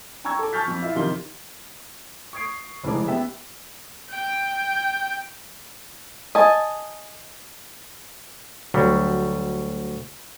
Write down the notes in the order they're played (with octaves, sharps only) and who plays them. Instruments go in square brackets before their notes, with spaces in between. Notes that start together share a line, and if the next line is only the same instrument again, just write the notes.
[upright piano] G5 A#5 C#6 E6 G#6
A4 D6
A5 C#6 F6 G6 A6 B6
F2
E4 F4 E5
F2 C3 D#3 C6 G7
C#6 D#6 G#6 C7 D7
F1 C#2 E3 G#4 D6
B3 G4 E5
[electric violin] G5
[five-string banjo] D#5 G#5 A5
[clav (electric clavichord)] D2 F#3 G3